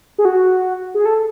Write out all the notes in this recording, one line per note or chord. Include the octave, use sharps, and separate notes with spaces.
G#4
F#4
G#4
A4